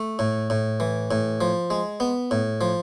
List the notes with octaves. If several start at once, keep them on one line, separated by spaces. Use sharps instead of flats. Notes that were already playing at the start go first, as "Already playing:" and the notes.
Already playing: A3
A2
A2
E3
A2
F3
G#3
B3
A2
F3